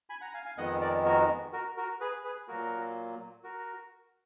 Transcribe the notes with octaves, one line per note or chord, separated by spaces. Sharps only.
G#5 B5
F#5 A#5
F5 G#5
F5 G#5
F2 D#3 G#3 B3 D#5 F#5
A#4 D5
F#4 A#4
F#4 A#4
F#4 A#4
G#4 B4
G#4 B4
A#2 F#3 A#3 F#4 A#4
F#4 A#4